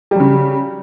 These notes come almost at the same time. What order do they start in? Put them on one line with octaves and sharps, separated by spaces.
G3 F#3 C#3